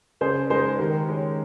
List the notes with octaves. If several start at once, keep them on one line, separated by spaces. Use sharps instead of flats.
C#3 G#4 C5
G#3 D#4 G#4 C5
D#3 G4 A#4
G#3 C#4